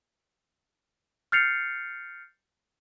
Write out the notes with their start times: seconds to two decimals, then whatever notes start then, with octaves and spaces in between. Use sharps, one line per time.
1.32 F6 G6 A6 C7 C#7 F7